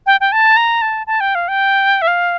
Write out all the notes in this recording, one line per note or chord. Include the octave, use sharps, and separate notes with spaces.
G5
G5
A5
A#5
A5
A5
G5
F5
G5
E5
F5